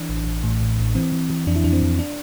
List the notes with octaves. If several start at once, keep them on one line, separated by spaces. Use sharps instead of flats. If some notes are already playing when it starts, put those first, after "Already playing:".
Already playing: E3 D4
A1
A1
A2
A1
A1
E3 C4
E3
E3
F2 D4
E4
F2 D4
C4
F2
D4